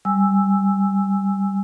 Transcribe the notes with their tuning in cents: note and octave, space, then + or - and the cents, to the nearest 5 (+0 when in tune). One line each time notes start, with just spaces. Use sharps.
G3 +0 G#5 -10 E6 +0